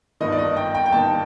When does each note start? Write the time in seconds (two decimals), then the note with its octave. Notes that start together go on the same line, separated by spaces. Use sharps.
0.20 G1 G2 D#3 D#5
0.32 D5
0.38 D#5
0.57 G5
0.75 G5
0.86 G5
0.91 G1 G2 D#3 A5